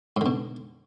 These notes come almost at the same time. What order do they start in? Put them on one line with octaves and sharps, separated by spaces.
G#2 D3 B2